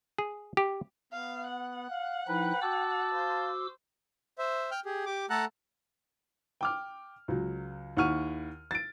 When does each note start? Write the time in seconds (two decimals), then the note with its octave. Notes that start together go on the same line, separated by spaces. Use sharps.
0.18 G#4
0.57 G4
1.13 B3 F5
1.48 F#5
1.90 F5
2.28 F3 D#4 E4 B4 G5
2.62 F#4 A5 D6 E6
3.14 C5 F5
4.38 C5 E5
4.71 G5 F6 G6
4.85 G4 G#4
5.06 G4 D6
5.30 A3 A4 F#5 A5 A#5 F#6
6.61 G5 D6 F6
7.28 C#2 F#3
7.97 D#2 E4 F#5 C#6 F6 D#7
8.71 A6 D7